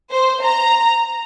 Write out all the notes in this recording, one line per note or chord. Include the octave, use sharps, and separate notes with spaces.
C5
A#5